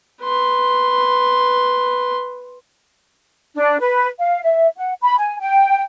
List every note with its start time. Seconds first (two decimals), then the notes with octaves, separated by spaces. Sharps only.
0.23 B4 C6
3.56 D4
3.80 B4
4.20 F5
4.44 E5
4.77 F#5
5.02 B5
5.19 G#5
5.40 G5